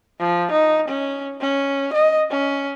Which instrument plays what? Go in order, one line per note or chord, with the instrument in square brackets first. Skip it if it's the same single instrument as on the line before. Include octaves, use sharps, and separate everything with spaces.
[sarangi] F3
D#4
C#4
C#4
D#5
C#4